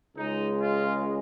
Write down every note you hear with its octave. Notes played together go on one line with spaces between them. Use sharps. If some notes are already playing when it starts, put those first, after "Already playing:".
C#2 C#3 G#3 D#4
F4